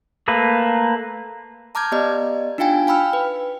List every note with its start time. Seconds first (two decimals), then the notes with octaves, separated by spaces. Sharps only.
0.28 A3 A#3 B4
1.75 A5 A#5 D6 F6 G6 G#6
1.92 B3 G4 D5 D#5
2.58 D4 D#4 F4 F5 G5 G#5
2.87 F5 G5 B5 E6 F6
3.13 B4